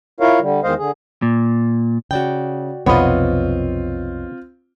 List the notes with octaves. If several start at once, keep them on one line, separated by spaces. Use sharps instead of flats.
E4 F4 A#4 C#5 F5
D3 G3
E2 D#3 G#3 C5 D#5 F5
D3 G#4
A#2
C#3 F#4 D5 G5
B1 F2 C3 B3 C4 F4 C#5 D#5